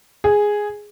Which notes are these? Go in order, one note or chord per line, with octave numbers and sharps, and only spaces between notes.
G#4